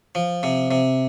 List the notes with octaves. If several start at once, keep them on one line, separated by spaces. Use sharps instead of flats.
F3
C3
C3